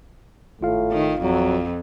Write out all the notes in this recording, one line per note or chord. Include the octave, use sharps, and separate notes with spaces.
G#1 A2 F4 F5
D#3
F2 F#3